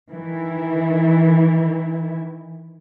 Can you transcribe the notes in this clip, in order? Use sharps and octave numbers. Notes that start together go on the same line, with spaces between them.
D#3 E3 E4